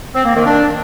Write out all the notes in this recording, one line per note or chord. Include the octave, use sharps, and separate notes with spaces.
C4
A#3
D#3
D4